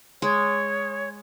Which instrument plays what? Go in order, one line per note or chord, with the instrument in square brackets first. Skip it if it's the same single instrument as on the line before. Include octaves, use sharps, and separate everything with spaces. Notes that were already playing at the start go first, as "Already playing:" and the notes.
[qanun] G#3 [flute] C#5